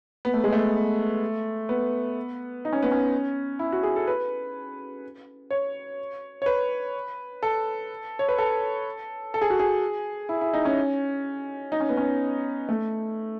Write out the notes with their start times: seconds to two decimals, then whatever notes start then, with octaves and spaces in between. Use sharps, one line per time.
0.25 B3
0.34 A3
0.44 G#3
0.52 A3
1.69 B3
2.65 D#4
2.73 C#4
2.83 B3
2.91 C#4
3.59 E4
3.72 F#4
3.83 G#4
3.96 A4
4.07 B4
5.50 C#5
6.42 C#5
6.46 B4
7.43 A4
8.19 C#5
8.29 B4
8.38 A4
9.34 A4
9.42 G#4
9.50 F#4
9.60 G#4
10.29 E4
10.41 E4
10.54 D#4
10.65 C#4
11.72 D#4
11.80 C#4
11.89 B3
11.97 C#4
12.69 A3